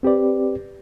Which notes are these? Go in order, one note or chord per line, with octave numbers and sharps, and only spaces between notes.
C4 G4 B4 D5